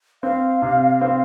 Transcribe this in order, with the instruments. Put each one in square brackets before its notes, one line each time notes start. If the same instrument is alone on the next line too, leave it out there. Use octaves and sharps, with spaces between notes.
[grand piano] C4 [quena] F5
[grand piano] C3
C4